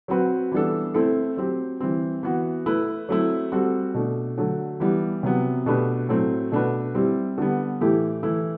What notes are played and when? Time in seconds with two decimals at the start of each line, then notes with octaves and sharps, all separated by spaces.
0.08 F#3 C4 F#4 B4
0.52 E3 G3 B3 D4 A4
0.94 A3 C4 E4 A4
1.37 F#3 C4 G4
1.80 E3 G3 C4
2.23 E3 B3 F#4
2.66 A3 E4 B4
3.09 F#3 A3 C4 E4
3.52 G3 C4 F#4 A4
3.94 B2 A3 D4
4.38 D3 F#3 A3
4.80 E3 G3 B3
5.23 C3 F#3 B3
5.66 B2 A3 D4 G4 B4
6.09 A2 F#3 A3 C4
6.52 B2 A3 D4 F#4 B4
6.95 G3 C4 E4 G4
7.38 D3 G3 B3
7.81 A2 E3 A3 E4 G4
8.23 E3 A3 E4